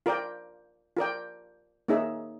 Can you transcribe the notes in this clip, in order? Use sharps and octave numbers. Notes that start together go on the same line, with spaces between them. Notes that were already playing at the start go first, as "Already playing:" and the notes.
F4 A#4 D5 G5
F4 A#4 D5 G5
A#3 D#4 G#4 C#5 E5